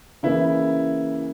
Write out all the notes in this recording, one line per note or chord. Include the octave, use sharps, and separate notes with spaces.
C#3 E3 A#3 E4